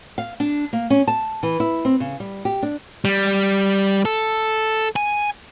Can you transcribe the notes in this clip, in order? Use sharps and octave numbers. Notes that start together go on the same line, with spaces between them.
F5
D4
A#3
C#4
A5
E3
E4
C4
C#3
G3
G4
D4
G3
A4
G#5